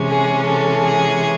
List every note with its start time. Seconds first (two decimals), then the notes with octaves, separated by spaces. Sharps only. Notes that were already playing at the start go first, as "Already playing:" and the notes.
Already playing: C3 E3 G#3 C#4
0.08 G#4
0.47 A4
0.84 G#4